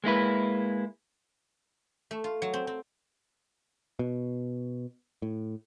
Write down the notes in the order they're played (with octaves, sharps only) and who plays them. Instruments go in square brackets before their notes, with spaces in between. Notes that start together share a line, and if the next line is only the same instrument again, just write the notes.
[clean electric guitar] G#3 A#3 E4 B4
[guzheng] A3
F4
F#3
C4
C4
[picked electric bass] B2
A2